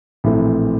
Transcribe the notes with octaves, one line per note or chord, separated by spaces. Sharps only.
A#1 A2 E3 A3 C4